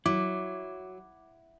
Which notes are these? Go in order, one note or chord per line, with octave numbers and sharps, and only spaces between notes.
F#3 E4 D6